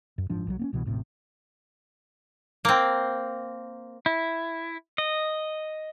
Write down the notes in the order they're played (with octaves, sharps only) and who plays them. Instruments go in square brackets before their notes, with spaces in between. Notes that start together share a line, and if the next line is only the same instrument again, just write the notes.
[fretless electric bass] F#2
F#1 G#2 F3 D4
B1 D#3 F#3
A#3 C4 C#4
C2 B2 E3
E1 A1 A2 C3
[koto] A#3 C4
[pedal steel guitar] E4
D#5